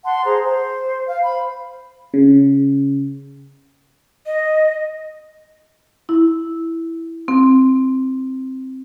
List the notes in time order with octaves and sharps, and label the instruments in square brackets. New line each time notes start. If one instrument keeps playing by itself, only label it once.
[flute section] F#5 A5 C6
G#4 C5 A#5
C5
F5
C5 B5
[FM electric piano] C#3
[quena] D#5
[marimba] E4
C4